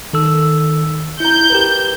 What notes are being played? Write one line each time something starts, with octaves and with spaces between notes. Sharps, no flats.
D#3 A4 E6
E4 A#5 G6
G4 A#4 B4